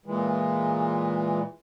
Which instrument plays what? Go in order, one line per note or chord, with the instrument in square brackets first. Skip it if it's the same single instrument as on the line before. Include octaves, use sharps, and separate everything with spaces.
[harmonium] A#2 E3 G#3